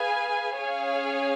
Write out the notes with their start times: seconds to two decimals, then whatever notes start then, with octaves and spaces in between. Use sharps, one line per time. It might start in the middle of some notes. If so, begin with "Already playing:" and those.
Already playing: G#4 B4 F5 G#5
0.56 C#4 G#4 C#5 F5 G#5